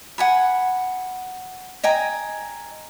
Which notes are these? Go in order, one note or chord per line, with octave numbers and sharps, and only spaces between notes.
F#5 G#5 B5
D#5 G5 G#5 A#5